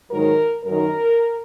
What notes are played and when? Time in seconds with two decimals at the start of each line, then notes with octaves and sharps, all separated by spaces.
0.11 G#2 D#3 F#3 A#4
0.64 F#2 D#3 F#3 A#4